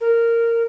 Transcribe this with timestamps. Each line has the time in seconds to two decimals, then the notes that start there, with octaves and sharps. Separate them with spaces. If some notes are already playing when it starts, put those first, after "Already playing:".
0.01 A#4